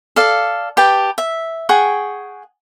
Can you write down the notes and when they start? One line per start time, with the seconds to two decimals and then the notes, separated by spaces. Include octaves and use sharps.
0.16 A4 D5 F5
0.77 G4 B4 G5 A5
1.18 E5
1.69 G#4 F#5 G5 C#6